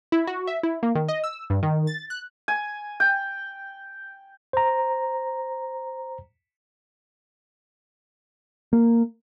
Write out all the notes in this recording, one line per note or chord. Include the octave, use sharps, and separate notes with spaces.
E4
F#4
E5
E4
A#3
D#3
D#5
E6
G2
D#3
A6
F#6
G#5
G5
C5 A#5
A#3